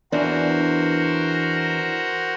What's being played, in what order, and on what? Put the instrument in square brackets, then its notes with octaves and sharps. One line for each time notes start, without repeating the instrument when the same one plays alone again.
[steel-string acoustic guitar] E2 E3 D4 [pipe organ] F#4 A#4 C5